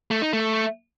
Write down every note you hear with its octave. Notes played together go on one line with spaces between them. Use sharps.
A3
D#4
A3